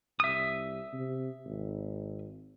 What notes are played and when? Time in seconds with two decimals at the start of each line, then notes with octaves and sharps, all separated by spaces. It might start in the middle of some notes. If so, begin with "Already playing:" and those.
0.20 C2 E5 D#6
0.93 C3
1.45 G#1